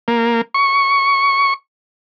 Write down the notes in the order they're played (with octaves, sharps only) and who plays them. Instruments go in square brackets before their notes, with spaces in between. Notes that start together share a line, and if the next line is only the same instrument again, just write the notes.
[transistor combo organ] A#3
C#6